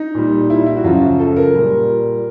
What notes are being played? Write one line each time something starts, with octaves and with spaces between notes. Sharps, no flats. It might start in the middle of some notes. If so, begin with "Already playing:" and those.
Already playing: D#4
A#2 G3
E4
E4
F#4
F#2 C#3 F3 F4
A4
A#4
A#2 G3